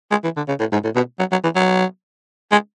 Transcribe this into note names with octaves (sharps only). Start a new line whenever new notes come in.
G#3
E3
D3
C#3
A2
G#2
A2
B2
F#3
F#3
E3
F#3
G#3